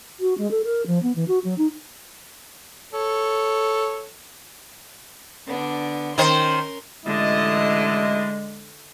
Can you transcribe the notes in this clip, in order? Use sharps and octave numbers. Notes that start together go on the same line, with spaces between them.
F#4
G#3
A4
A#4
F3
B3
E3
F#4
F#3
D#4
A4 C#5
D3 B3 D4
D#3 C#4 A#4 C5 C6
A1 D3 G#3 E4 D#5